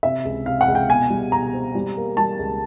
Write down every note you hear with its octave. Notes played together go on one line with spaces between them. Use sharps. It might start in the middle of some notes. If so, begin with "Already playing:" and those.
C3 E5
C#2
C3 F5
F#5
C#2
G5
B2 G#5
G3
B2 A#5
C4
G3
A#3
G3 A5
C#2